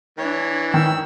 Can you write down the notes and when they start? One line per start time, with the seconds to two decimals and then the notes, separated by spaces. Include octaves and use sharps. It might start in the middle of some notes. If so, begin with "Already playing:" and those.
0.18 E3 D4 C#5
0.74 D#3 E6